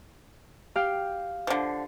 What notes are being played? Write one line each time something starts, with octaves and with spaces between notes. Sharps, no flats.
G4 F5 G5
D3 F3